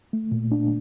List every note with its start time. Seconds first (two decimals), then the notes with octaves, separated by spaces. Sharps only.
0.13 A3
0.32 A#2
0.51 D4